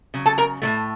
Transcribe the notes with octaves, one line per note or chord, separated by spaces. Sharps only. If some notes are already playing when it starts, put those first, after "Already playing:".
C#3 F#3
A4 A5
A#4 A#5
A2 F#3 A3